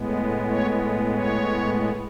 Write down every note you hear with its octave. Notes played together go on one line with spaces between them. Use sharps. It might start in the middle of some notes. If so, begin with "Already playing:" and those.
Already playing: A2 G#3 B3
C#5
C#5